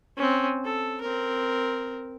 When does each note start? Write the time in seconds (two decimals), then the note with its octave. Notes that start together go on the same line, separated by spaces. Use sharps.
0.17 C4 C#4
0.64 A4
1.01 C4 A#4